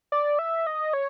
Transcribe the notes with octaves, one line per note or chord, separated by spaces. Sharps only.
D5
E5
D#5
C#5